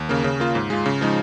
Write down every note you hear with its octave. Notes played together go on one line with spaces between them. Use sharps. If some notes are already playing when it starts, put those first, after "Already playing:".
Already playing: D#2
C#3 A#3
C#3
A#3 F4
G#2
G#3 F4
C#3
F3 G#3 D#4